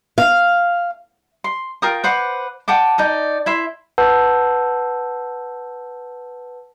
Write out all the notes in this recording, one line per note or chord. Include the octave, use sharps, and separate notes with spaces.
F5
C6
F4 A#4 G5 D#6
B4 C5 F#5 D6
F#5 G5 A5 D6
D#4 D5 D#5
E4 E5 C6
B4 F#5 A5 E6 G6